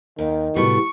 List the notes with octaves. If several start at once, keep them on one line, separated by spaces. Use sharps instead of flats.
D#2 D#3
A2 C3 G3 A3 B3 F#4 C#6